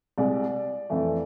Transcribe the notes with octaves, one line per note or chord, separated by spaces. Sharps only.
C2 C3 G#3 D5
F2 E3 A3